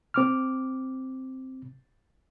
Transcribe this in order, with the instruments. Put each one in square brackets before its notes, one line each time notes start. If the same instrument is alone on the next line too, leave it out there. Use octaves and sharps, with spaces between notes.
[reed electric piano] C4 D6 F6